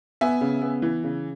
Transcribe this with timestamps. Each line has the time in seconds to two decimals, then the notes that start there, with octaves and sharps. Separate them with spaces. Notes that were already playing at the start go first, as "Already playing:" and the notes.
0.21 B3 E5 G#5
0.41 C#3
0.62 B3
0.82 E3
1.04 C#3